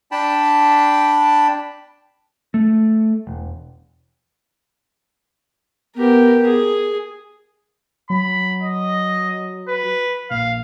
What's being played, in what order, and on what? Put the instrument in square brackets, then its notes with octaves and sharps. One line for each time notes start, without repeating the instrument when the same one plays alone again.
[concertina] D4 G5 A5 B5
[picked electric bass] A3
E1
[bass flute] B3 [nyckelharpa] G4 A#4
[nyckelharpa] G#4
[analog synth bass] F#3 [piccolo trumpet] B5
[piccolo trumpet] D#5
B4
[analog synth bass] A#1 [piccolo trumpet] F5